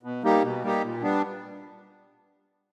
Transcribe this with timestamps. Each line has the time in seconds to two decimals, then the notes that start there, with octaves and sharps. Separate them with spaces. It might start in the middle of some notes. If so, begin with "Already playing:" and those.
0.03 B2
0.23 G3 A#3 D#4 G4
0.43 B2
0.62 G3 A#3 D#4 G4
0.83 A#2
1.02 G3 B3 D4